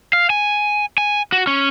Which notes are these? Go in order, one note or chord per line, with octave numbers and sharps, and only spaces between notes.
F5
G#5
G#5
F#4
C#4